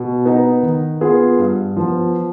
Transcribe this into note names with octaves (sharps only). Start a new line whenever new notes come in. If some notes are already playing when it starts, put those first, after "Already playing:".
Already playing: B2
B3 D#4
D#3
B3 F4 G#4
G2
F3 B3